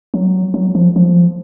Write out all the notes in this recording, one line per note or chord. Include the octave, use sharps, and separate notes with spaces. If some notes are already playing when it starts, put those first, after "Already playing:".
F#3
F#3
F3
F3